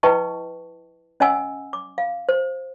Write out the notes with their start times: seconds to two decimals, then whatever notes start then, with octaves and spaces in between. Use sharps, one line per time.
0.03 E4 B4 D#5 G5 A5 C#6
1.20 C#4 D#5 F#5 G#5 E6
1.73 D6
1.98 F5
2.29 C5